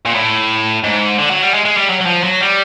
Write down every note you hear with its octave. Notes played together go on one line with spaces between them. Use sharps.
A#2
A2
G#2
D3
F#3
G3
G#3
G#3
G3
F#3
F#3
F3
F#3
G3